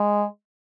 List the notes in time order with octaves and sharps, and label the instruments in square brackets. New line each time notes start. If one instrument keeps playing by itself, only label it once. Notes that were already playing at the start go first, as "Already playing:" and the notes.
Already playing: [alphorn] G#3